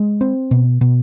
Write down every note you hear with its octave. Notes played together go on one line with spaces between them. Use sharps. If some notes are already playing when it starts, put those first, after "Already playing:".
Already playing: G#3
C4
B2
B2